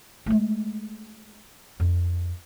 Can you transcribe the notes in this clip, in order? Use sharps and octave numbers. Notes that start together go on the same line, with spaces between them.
G#3 A3
F2